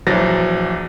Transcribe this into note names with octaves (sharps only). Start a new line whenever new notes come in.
A#1 E3 F#3 C5 A6 A#6